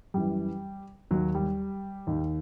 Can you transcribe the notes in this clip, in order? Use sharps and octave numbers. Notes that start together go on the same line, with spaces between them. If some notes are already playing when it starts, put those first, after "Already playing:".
F#2 E3 G3
D#2 D#3 F#3
G3
D#2 D#3